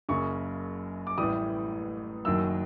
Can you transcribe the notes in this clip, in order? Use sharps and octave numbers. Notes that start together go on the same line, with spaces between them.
F#1 F#2 C#3 C#6
D6
A1 A2 E3 G3 D#6
F#1 F#2 D#3 F#3 E6